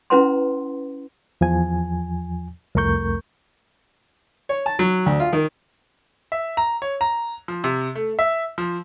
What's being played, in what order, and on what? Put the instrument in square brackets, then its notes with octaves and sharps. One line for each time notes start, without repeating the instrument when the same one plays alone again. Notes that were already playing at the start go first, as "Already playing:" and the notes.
[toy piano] C#4 E4 B4 F#5 A#5 C6
[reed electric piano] E2 F3 G#5
C2 F2 A3 A#4 C#6 G6
[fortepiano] C#5
A5
F#3
D2
F4
D#3
[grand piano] E5
A#5
C#5
A#5
F3
C3
A3
E5
F3